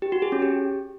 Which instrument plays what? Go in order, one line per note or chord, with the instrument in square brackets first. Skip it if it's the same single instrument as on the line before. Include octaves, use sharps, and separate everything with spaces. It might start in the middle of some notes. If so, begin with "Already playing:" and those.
[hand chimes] G4
F#4
G#4
C#4
G4